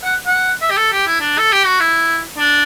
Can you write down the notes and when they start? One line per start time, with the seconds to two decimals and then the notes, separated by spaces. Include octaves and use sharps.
0.04 F#5
0.27 F#5
0.62 E5
0.71 G4
0.77 A4
0.92 G4
1.07 E4
1.21 D4
1.38 A4
1.53 G4
1.67 F#4
1.80 E4
2.38 D4